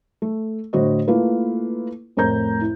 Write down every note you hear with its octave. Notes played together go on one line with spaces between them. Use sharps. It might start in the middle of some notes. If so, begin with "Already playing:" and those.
A3
A2 D3 F#4 C5 D#5
A3 A#3 E4 F4 B4
F2 A2 A#4 A#5 G6
E4